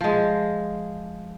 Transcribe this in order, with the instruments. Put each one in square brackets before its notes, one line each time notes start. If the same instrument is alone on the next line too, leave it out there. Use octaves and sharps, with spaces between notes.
[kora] F3 G#3